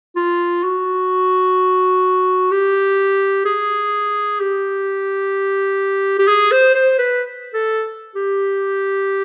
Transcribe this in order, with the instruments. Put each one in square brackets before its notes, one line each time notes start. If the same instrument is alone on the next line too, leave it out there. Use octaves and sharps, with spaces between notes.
[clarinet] F4
F#4
G4
G#4
G4
G4
G#4
C5
C5
B4
A4
G4